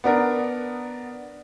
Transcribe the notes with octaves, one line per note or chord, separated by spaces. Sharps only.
B3 D4 A#4